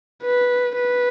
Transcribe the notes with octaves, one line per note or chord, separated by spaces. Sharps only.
B4
B4